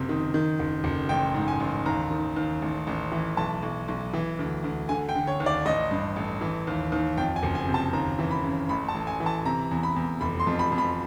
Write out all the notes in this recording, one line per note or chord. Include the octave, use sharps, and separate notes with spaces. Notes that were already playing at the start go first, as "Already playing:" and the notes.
Already playing: F#1 C3
D#3
D#3
F#1
F#1
A1 G5
G#2
G#5
A1
D#2 A#5
D#3
D#2
A1
A1
E3
B1 A5
B1
B1
E3
D2
D2
D3 G#5
G5
D3
C#5
D#2
D5
A1 D#5
G2
A1
E3
D#2
D#2
F2 G5
G#5
F#1
G#5
C3
A5
D#2 A#5
E3
B5
C#3
A1 B5
A5
A1
G#5
E3
A5
C3 A#5
E2
B5
E2
F1 B5
C6
F2
B5
F2
B5